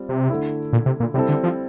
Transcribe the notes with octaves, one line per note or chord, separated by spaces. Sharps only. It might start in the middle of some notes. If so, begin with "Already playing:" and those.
Already playing: G3 C4 F4
C3
D3 A3 E4
A#2
C3
A#2
C3 G3 C4 E4 A4
D3
F3